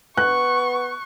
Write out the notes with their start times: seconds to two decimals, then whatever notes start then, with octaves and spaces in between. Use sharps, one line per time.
0.18 B3 C#6 F#6